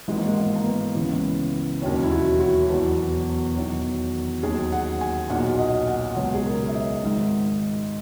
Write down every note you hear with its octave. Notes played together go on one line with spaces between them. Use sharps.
G#1 G#2 E3 G#3
A#3
G#3
A#3
A#3
B3
C#2 C#3 E3
E1 D#2 D#3 F#3 C#4
E4
F#4
F#4
E1 E2 B2 F#3
E2 D#3 F#3
D#2 D#3 F#3 G#4
F#5
G#5
B1 A#2 F#3 F#5
D#5
F#5
C#2 B2 F#3 C#5
G#4
A#4
E5
D#5
G#1 G#2 D#3